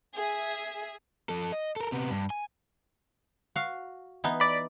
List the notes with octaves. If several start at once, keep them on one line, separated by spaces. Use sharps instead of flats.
G#4 E5
F3 A4
D#5
A4 A#4
C3 B3
G2
G#5
F#4 F5
E3 B3 D#4
D5 B5